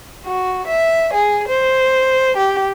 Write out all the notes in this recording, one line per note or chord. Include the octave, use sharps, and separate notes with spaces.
F#4
E5
G#4
C5
G4